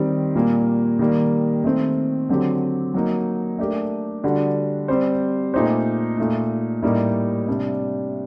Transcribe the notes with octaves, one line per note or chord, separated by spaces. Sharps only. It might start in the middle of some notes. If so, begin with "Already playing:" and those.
Already playing: D#3 G3 C4
A#2 G3 A#3
D#3 G3 A#3
D#3 A3 C4
D3 F#3 C4 G4
F#3 A#3 D#4
A3 D4 G4 A#4
D3 G3 D4 F#4
G3 C4 G4 C5
A#2 A3 D#4 G4 C5
A#2 A3 D#4
A2 G3 A#3 D#4 G4
C3 G3 D4